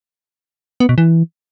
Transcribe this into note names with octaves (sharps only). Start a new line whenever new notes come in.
B3
B2
E3